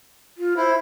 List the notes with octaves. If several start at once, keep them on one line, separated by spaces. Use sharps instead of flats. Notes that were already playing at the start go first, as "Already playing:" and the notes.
F4
E4 C5